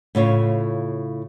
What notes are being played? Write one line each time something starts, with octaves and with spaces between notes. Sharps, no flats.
A2 C#3 F4 C#5